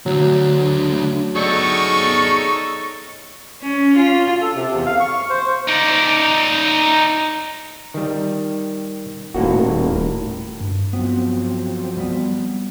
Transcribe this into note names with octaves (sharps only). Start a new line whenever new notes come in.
D2 D3 F#3
D#4 G#4 A4 C#5 D5 C#6
C#4
F4
A4
C3
E2
F5
C#6
C5
D#4 D5
D#3 G3
D#1 A2 A#3 F#4
G2
F3 F#3 B3 C4
G3 B3